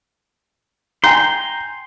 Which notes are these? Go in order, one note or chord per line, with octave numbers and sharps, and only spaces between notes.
G5 G#5 A#5 C6 G6